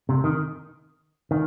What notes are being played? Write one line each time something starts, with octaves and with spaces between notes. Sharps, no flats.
C3
D#3
D#3